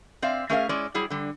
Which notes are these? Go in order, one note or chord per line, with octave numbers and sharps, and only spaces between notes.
C4 D5 E5 F5
A3 C#4 G#4 A#4 E5 F5
G#3 C#4 E4 D5
F#3 G3 E4 G#4
D3 G3